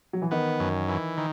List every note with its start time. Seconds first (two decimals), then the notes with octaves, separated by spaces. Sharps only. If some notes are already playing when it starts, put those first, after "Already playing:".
0.13 F#3
0.22 E3
0.31 D#3 B3
0.60 F#2
0.89 E3
1.18 D#3